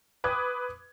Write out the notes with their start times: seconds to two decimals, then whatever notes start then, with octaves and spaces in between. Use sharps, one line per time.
0.24 B4 D6 D#6 G#6